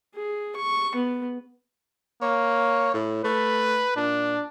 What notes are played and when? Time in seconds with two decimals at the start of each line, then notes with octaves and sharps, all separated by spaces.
0.15 G#4
0.56 C#6
0.95 B3
2.22 A#3 C#5
2.93 A2
3.24 A3 B4
3.96 A#2 D4